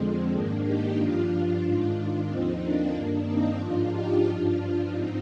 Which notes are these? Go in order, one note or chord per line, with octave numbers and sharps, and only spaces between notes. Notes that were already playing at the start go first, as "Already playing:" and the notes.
Already playing: F2 D3 F3 G#3 C4
G#2 D#3 A#3 D4
D#4 G4
G2 F3 D4 F4
G#2 D#3 D4 F4
D#2 D3 F3 C4 D#4
A#3 D4
G2 D#3
C4 D#4
G#2 F3 D4 F4
D#4 G4
G2 F3 D4 F4
G#2 C4 D#4